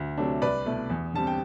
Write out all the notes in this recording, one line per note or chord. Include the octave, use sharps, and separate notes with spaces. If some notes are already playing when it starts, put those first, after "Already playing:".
Already playing: D2
C3 F#3 A3 D4
C2 B4 D5
B2 A3 E4
E2
D3 G3 C4 A5
G5